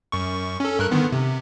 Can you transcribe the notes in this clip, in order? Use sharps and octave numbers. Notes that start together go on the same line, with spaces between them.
F#2 C#6
C#4 A4
G2 A#4 F#6
D3 D#3 B3
C3